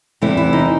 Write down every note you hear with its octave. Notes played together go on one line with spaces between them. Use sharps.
E2 C3 E3 A3 E4
E4
D#4